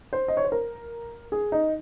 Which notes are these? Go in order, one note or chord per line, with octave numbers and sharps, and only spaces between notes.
C5
D#5
C#5
C5
A#4
G#4
D#4